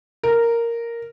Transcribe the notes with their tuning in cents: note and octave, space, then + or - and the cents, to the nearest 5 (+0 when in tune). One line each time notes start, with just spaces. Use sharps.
A#4 -5